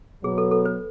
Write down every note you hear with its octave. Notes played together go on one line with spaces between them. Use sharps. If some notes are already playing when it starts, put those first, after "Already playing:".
B2 F#3 B3 G#4
A4
A4
B4